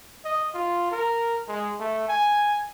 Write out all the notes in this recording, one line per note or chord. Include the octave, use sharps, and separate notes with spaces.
D#5
F4
A#4
G#3
A3
G#5